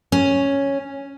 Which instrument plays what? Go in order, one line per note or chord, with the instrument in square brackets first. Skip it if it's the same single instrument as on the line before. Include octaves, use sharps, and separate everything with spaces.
[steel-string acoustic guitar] C#4